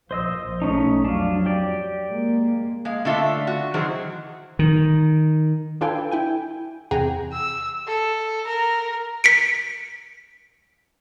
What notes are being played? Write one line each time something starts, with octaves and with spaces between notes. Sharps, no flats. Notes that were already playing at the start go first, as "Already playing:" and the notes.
A#1 A#2 F3 C5 D#5 E6
B1 G#3 A3 C#4 D#4
F2 F#3 D4 F4
G4 D5
G#3 A#3
G#3 F5
D3 A3 F4 E5
F#4
D#3 E3 F#3 G#4 C5
D#3
D4 F4 A4 B4 G5 G#5
E4 G5 G#5
E2 C3 G#4 F#5 G5 A#5
E6
A4
A#4
B6 C#7 D7